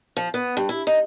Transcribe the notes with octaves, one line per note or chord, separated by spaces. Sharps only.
F3
B3
G2
E4
D#4